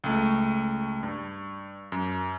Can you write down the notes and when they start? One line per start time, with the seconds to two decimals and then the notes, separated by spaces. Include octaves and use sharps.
0.04 C#2 A3
1.03 G2
1.92 F#2